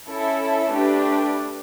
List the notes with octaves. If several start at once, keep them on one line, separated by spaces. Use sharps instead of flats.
C#4 E4 A4 E5
A3 D4 G4 B4